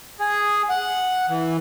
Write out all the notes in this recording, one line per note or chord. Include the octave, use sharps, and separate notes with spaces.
G#4
F#5
E3